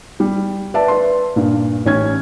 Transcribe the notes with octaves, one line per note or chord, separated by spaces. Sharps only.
G3
B4 D5 E5 A5
B4 C6
G2 A#2
A1 C#4 G#6